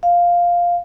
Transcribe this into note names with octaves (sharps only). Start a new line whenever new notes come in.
F5